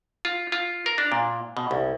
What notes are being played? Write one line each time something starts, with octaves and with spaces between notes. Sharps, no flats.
F4
F4
A#4
D4
A#2
B2
C2